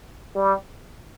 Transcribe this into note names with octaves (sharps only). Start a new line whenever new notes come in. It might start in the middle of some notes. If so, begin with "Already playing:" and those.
G3